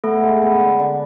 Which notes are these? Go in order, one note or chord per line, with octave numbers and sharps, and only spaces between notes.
A3 B3 A4
G#3
B3
D3
D3